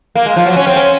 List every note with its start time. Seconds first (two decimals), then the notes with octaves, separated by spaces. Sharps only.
0.15 A#3
0.26 G#3
0.36 F3
0.46 F#3
0.56 C#4
0.67 C4
0.76 C#4